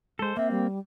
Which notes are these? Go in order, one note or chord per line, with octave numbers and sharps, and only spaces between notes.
G#3 A4 C5
A#3 C4 E5
G3